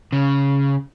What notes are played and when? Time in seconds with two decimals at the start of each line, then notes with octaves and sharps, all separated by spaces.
0.13 C#3